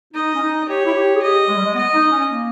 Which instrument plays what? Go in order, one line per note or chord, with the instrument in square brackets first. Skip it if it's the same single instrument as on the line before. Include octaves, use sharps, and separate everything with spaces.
[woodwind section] D#4 [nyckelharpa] D#5
[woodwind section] C#4
D#4
[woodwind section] G4 [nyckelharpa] C#5
[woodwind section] E4
G4
G#4
[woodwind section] G4 [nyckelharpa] D#5
[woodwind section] G#3
G3
G#3
[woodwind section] B3 [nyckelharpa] D#5
[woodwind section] D#4
C#4
A#3